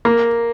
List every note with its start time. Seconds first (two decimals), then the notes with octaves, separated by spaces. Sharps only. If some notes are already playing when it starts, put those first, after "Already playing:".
0.05 A#3